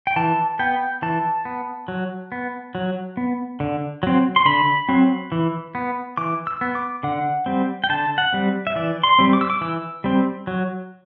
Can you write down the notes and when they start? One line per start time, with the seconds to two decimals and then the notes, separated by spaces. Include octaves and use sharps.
0.07 G5
0.16 E3 A5
0.59 B3 G5
1.02 E3 A5
1.45 B3
1.88 F#3
2.32 B3
2.75 F#3
3.17 B3
3.60 D3
4.03 F#3 C4
4.36 C6
4.45 D3 B5
4.89 F#3 C4
5.32 E3
5.75 B3
6.17 E3 D6
6.47 E6
6.61 B3
6.75 D6
7.03 D3 F#5
7.46 G3 C4
7.84 G5
7.89 D3 A5
8.18 F#5
8.33 G3 C4
8.67 E5
8.76 E3 D5
9.03 C6
9.19 G3 C4
9.33 D6
9.41 E6
9.50 D6
9.61 E3 E6
10.04 G3 C4
10.47 F#3